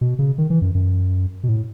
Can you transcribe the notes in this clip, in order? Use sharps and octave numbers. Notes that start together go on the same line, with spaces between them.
B2
C#3
D#3
E3
F#2
F#2
B2
A2